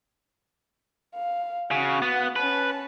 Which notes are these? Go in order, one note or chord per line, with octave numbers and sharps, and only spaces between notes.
F5
C#3 F#4 F#6
B3
C#4 B4 A5